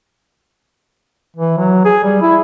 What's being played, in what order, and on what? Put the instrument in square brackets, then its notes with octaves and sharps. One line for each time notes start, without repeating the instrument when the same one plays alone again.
[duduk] E3
F#3
G#4
G3
E4